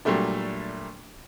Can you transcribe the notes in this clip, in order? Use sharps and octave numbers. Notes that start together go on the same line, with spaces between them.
A#2 F#3 G3 A3 D4